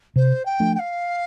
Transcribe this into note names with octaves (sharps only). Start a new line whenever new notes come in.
C3 C5
G5
F3 A3 D4
G5
F5